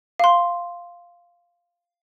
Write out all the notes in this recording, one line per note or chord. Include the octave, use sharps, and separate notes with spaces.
F5 C6